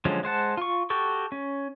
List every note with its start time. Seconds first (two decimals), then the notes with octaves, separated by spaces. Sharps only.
0.05 D3 F3 F#3 G#3 C#4
0.23 G#3 C5 F#5 A5
0.57 F4 C#6
0.90 F#4 G4 A4 C#6
1.32 C#4